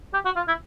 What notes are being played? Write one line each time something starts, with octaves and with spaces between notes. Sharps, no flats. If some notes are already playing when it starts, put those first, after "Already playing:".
G4
F#4
F4
E4